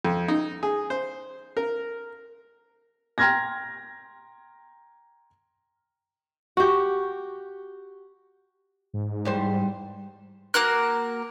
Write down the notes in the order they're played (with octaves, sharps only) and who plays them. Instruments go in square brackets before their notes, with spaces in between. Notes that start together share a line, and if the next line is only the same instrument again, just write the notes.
[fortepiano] F2
D#4
G#4
C5
A#4
[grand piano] G5 A#5 C6 F6 G#6 A#6
[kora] F#4 G4
[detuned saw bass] G#2
[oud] E2 G3 C5
[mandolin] A#3 F#4 A#4 F#6